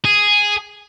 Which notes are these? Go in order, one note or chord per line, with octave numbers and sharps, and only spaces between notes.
G#4